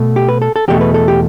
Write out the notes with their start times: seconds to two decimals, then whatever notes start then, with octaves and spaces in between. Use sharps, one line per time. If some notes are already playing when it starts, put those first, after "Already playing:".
Already playing: B2 A3
0.16 G4
0.29 B4
0.42 A4
0.56 A4
0.68 E2 B2 A3 G4
0.81 B4
0.94 A4
1.08 G4